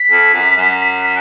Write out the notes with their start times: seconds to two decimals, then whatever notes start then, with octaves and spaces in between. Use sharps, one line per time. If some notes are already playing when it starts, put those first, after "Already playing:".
Already playing: B6
0.11 F2
0.35 F#2
0.58 F#2
0.80 B6
0.97 B6